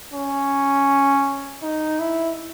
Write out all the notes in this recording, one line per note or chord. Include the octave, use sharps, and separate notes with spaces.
C#4
D#4
E4